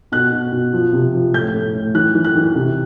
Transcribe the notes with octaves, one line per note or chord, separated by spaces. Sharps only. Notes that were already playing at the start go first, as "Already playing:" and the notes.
B2 F#6
B2
B2
F3
C3
F3
A2 G6
A2
A2
E3 F#6
E3
F#6
E3
C3